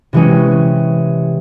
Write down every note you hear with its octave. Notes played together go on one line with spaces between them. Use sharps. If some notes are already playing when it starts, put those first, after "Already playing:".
C3 E3 G#3 C#4